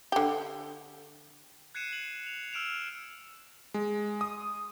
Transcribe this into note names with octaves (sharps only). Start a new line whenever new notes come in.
D3 G4
F#6 G#6 C7 C#7 D#7 E7
F#7
F7
E6 F6 D7 E7 F7
G#3
D#6